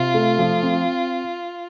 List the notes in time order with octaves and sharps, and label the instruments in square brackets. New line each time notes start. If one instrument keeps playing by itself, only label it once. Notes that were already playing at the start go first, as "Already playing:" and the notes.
Already playing: [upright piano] C3 [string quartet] F4
[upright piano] A3
F3
C4